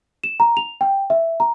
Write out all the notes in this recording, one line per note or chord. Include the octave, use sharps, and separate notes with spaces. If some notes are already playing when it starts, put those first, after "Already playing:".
E7
A#5
F7
G5
E5
A#5